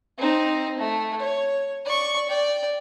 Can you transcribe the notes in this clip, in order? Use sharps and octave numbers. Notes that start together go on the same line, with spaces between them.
C4 D#4
A3
C#5
D5 C#6
D5 G5